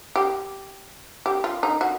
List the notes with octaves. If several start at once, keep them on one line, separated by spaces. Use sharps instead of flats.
G4
G4
F4
D#4
F#4